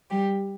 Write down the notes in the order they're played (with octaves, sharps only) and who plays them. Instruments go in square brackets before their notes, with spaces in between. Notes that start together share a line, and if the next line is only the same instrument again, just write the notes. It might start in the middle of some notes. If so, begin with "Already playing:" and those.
[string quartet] G3 G4